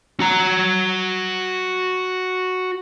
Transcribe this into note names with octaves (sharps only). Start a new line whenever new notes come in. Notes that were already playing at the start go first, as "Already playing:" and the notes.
F#4 A#5